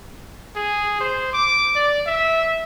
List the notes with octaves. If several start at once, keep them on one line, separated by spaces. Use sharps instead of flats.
G#4
C5
D6
D5
E5